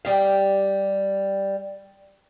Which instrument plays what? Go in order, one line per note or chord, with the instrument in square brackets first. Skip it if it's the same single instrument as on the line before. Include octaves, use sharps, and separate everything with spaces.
[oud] G3 G4 F5